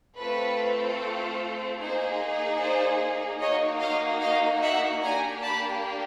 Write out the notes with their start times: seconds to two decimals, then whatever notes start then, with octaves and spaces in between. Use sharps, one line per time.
0.17 A3 C4 F4 A4 B4
1.79 A#3 D#4 G#4 C5
2.59 C5 D5
3.40 A#3 D#4 F#4 C#5 D#5
3.81 D#5 F5
4.21 D#5 F5
4.62 E5 F#5
5.02 A#3 D4 G4 G#5 A#5
5.43 A5 B5